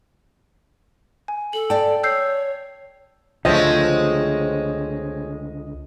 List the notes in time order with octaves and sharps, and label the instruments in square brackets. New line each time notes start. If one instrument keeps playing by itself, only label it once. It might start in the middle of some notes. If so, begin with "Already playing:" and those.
[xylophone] G#5
[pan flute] A4 [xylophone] F#7
[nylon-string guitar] D5 G5 [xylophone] A5
[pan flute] C#5 [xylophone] E6 G6 C7
[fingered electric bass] C#2 D3 [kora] F3 A3 [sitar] G#3 C4 C#4 [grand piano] D#5